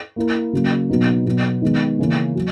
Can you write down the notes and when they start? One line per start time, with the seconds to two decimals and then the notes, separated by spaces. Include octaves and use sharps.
0.16 A#3 E4 A#4
0.53 C#3 F#3 A#3
0.90 B2 F#3 B3 D#4
1.26 B2 F#3 B3
1.62 D#3 G#3 B3
1.99 C#3 E3 A#3 C#4
2.35 F#3